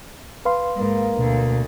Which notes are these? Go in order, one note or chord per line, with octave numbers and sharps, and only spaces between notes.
B4 F5 C6
G#2 A#3
D2 B2